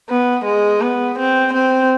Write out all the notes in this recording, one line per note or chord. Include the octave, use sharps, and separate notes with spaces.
B3
G#3
B3
C4
C4